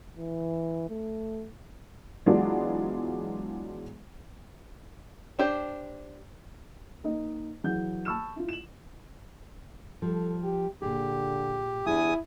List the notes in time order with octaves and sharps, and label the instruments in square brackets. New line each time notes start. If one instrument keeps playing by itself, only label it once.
[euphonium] E3
A3
[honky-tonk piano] E3 F#3 G#3 B3 D4 F4
[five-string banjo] D4 G4 C5
[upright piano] A#3 D#4 D#5
E3 F#3 G#4 F#5 G6
A5 B5 C#6 E6 F6 E7
E4 F4
E7 F#7
[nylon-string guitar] F3 G3 [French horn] A4
[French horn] G4
[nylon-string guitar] A#2 G#4 [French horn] D3 [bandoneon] G4
[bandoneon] E2 G#5 D#6 [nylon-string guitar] D4 G4 G#4 [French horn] E4